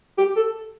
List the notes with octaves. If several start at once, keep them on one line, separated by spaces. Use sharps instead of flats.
G4
A4